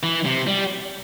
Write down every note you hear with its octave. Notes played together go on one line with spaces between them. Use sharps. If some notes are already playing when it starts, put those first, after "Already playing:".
E3
C3
G3